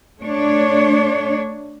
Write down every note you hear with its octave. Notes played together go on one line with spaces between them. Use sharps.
A3 D4 C#5